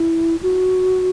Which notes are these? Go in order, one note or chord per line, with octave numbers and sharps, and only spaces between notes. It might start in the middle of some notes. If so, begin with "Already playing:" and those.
Already playing: E4
F#4